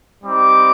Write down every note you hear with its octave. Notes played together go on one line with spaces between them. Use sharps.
G3 C4 D#4 G4 D6